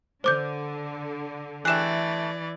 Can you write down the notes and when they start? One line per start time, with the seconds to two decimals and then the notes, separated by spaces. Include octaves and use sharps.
0.24 D3 C5 D6 G6
1.65 E3 A3 G4 G#4 D5 F#6 E7